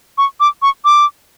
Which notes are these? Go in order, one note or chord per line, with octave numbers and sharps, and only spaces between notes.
C#6
D6
C#6
D6